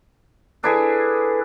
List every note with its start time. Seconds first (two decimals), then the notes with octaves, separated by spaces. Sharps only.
0.64 D4 E4 G#4 A4 B4